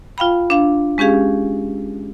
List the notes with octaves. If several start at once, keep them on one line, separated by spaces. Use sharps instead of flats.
F4 F5 G5 B5
D4 F5
G#3 C#4 G4 G#4 F5